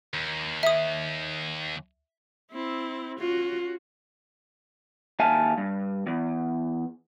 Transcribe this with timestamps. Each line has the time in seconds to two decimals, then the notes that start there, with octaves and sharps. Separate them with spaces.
0.13 D#2
0.63 E5 D#6
2.51 C4 E4
3.19 C#4 F4 F#4
5.19 D#2 E5 F5 G#5 A5
5.58 G2
6.07 E2